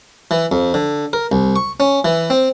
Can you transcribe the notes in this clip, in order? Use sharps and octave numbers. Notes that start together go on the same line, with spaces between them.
E3
F2
D3
A#4
C2
C#6
C#4
E3
C4